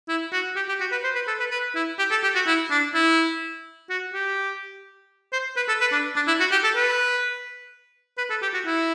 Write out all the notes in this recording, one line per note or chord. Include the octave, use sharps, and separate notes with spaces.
E4
F#4
G4
G4
F#4
B4
C5
B4
A4
B4
B4
E4
G4
A4
G4
F#4
E4
D4
E4
F#4
G4
C5
B4
A4
B4
D4
D4
E4
F#4
G4
A4
B4
B4
A4
G4
F#4
E4